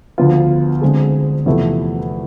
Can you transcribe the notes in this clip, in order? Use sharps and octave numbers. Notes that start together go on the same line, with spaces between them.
D2 D3 F3 B3 F4
D2 D3 G#3 C4 G#4
E2 C3 F3 A3 E4